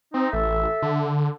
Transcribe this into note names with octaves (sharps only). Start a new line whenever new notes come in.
C4 D#4
A1 A4 E5
D3